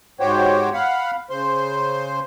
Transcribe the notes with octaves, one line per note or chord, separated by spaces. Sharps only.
G#2 F#4 G4 C5 C#5 G5
F5 F#5 B5
C#3 C5 C6